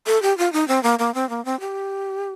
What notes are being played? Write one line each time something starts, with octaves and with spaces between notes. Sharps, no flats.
A4
G4
F4
D#4
C4
A#3
A#3
C4
A#3
C4
G4